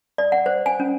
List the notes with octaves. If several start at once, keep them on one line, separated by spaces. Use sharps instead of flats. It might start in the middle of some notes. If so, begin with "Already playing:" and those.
D5
F#5
C5
G#5
C#4